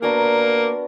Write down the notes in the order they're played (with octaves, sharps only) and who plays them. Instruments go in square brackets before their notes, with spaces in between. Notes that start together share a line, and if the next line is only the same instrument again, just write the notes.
[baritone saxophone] A#3 [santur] B3 D4 F#4 A#4